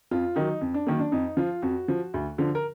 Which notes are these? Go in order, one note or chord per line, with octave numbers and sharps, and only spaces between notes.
F2 F4
D#3 F#3 D#4
F2
D4
D#3 F#3 A#3
D4
F2 D#4
F3 F4
F2 F#4
F3
D2
D3 F3
A#4